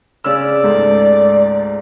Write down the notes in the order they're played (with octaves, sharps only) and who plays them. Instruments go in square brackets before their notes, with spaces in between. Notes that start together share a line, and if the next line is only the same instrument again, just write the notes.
[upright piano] C#3 C#4 E6 [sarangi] D5
[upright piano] C#2 G#2 A3